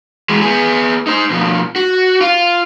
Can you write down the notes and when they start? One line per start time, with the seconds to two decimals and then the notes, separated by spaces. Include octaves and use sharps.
0.30 E3 G#3
0.42 B3 G#4
1.07 D#4 C5
1.30 B2 F3
1.76 F#4
2.21 F4